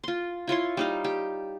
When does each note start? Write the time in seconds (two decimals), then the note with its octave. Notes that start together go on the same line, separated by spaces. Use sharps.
0.04 F4 C6
0.47 E4 F4 C#5 C6
0.77 G3 D#4 F5
1.04 G4